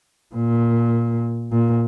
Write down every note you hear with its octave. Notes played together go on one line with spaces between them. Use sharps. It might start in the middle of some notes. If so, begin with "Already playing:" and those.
A#2
A#2